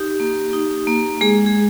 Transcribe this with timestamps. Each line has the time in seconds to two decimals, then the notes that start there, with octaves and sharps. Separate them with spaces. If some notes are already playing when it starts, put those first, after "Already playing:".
Already playing: D#4 G4
0.20 A#3
0.53 D#4
0.87 A#3
1.21 G#3 G#4
1.46 G#4